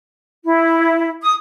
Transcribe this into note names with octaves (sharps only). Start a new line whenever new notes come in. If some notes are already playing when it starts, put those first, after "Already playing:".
E4
D#6